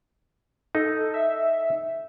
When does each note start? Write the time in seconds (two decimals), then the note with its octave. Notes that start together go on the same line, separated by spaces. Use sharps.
0.75 D#4 A4
1.14 E5